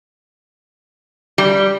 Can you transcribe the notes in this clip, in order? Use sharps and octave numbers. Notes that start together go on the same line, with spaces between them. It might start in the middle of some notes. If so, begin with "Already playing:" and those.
G3